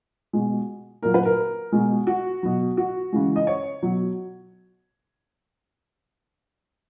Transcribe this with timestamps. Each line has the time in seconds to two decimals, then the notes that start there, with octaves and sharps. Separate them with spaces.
0.33 B2 G#3
1.03 A#2 F#3 A#4
1.14 B4
1.25 A#4
1.72 B2 G#3
2.07 F#4
2.43 B2 F#3
2.77 F#4
3.13 C#3 E3 G#3
3.36 D#5
3.47 C#5
3.82 B2 F#3